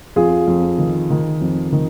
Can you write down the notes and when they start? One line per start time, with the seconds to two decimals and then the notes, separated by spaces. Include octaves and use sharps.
0.16 F2 F4 G#4
0.47 F2
0.78 D#3
1.10 D#3
1.41 F2
1.72 D#3